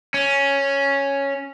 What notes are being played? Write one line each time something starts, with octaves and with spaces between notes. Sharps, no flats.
C#4